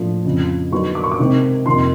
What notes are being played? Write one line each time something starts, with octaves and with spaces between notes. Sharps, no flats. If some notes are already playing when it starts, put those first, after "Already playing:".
Already playing: A2 F3 A3 D4
F2 C#3 F3
D3 F#3 B3 D#4 C#6
D6
C#6
D6
C3 D#3 G#3 C4 D#4
F2 C3 D#3 C6